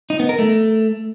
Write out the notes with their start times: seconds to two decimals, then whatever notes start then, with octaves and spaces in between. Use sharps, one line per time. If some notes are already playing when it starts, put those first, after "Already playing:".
0.10 D#4
0.20 B3
0.29 A#4
0.39 A3